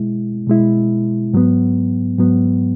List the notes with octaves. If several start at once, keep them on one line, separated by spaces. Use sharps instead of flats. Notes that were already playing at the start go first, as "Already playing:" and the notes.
Already playing: B2 G#3 E4
B2 G#3 E4
G#2 F#3 B3
G#2 F#3 B3